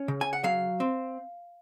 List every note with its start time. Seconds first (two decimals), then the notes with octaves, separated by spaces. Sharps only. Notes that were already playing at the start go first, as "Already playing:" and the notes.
Already playing: C#4
0.08 C#3
0.21 G#5
0.33 F#5
0.44 F#3 F5
0.80 C4